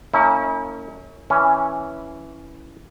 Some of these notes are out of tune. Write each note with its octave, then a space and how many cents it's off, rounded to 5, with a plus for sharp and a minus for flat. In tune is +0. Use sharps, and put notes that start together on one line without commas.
A#3 -35 C#4 +0 E4 -45
E3 +0 C#4 +0